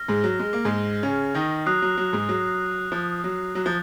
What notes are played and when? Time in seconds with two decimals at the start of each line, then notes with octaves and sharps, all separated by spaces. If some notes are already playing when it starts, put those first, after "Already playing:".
Already playing: F6 A#6
0.08 G#2 G#3
0.24 F#3
0.39 G#3
0.53 A#3
0.65 G#2 G#3
1.03 C#3 C#4
1.34 D#3 D#4
1.66 F#3 D#6 F#6 C7
1.82 F#3
1.97 F#3
2.13 G#2 G#3
2.29 F#3
2.92 F3
3.24 F#3
3.55 F#3
3.66 F3